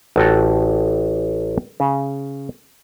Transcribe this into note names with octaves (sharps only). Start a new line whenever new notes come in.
A1 F#4 A4 G5 A5
C#3